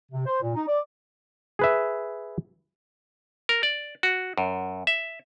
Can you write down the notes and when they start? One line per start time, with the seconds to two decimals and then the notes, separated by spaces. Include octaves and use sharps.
0.12 C3
0.26 C5
0.42 A#2
0.55 D#4
0.68 D5
1.59 G#4 B4 E5
3.49 A#4
3.63 D5
4.03 F#4
4.38 F#2
4.87 E5